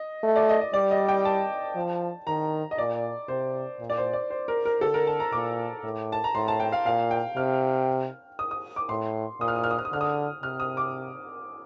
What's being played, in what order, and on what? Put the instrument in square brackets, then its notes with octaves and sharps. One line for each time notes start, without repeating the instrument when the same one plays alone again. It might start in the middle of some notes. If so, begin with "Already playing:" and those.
Already playing: [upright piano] D#5
[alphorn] A3
[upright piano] D5
D#5
D#5
[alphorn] G3 [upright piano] D5
[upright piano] D#5
G5
A5
[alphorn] F3
[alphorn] D#3 [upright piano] A#5
[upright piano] D#5
[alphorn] A#2 [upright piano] D5
[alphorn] C3 [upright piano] C5
[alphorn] A#2
[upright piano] D5
C5
D5
C5
A#4
A#4
[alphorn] D3 [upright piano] A4
[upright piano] A#4
A5
A#5
[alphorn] A#2 [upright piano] D6
[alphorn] A2
[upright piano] A5
A#5
[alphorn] A2 [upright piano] C6
[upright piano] A5
G5
F5
[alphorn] A#2 [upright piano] F5
[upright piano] G5
[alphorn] C3 [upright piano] F6
[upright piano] D#6
D#6
D6
[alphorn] A2 [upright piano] C6
[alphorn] A#2 [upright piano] D#6
[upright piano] F6
D#6
F6
D#6
F6
D#6
[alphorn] D3 [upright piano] F6
[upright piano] D#6
[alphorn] C3 [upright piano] F6
[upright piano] D#6
D6